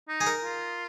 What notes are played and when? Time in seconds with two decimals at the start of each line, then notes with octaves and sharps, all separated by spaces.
0.09 D#4
0.21 G#4
0.26 A#4
0.44 F4